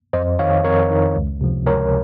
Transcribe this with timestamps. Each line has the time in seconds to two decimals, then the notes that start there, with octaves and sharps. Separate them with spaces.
0.13 F2 C5 D#5
0.39 D#3 C#5 F5
0.64 F2 A#4 C#5
0.91 D#3
1.16 C#2
1.41 C3 F3
1.66 C#2 A#4 C#5